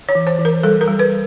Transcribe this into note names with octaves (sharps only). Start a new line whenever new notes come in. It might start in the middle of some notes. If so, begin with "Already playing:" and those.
C#5
E3
C5
E3
A#4
G3 A4
A#4
G3
B4